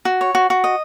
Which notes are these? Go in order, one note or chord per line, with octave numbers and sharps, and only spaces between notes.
F#4
C#5
F#4
F#4
D#5